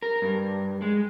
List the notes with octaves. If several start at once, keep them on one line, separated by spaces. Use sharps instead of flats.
A#4
G2
G#3